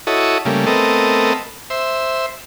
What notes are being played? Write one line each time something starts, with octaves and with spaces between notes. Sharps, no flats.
E4 F#4 A4 C#5 D#5
C#3 G3 A3 A#3
A3 B3 C4 A4 A#4 D#5
C5 E5